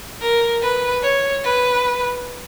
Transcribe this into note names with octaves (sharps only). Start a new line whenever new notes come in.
A#4
B4
C#5
B4